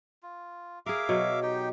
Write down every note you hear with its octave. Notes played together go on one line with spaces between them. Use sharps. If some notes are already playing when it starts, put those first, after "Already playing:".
F4
G#4 A#4 E5 F5 D6
B2 F#3
D#4 G4 G5